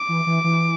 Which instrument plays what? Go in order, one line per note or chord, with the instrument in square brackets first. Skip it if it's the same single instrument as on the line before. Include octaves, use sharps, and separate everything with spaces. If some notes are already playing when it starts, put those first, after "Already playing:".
Already playing: [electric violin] D6
[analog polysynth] E3
E3
E3